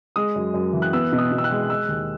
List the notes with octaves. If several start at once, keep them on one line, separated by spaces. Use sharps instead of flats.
G#3 D#6
F#2
F#2
E3
F#6
B3 E6
B2
D#6
B2
E6
F#6
G#3
G#3 E6
D#2